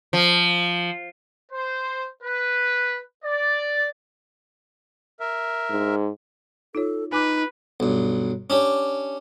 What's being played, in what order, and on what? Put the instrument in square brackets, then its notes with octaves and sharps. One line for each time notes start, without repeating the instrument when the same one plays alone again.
[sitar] F3
[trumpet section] C5
B4
D5
[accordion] A#4 E5
[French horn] G#2
[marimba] D#4 F4 C#5 [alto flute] A4
[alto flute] D#4 [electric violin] B4 [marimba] G#5 D6 F#6
[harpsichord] B1 G2
C#4 D4 G4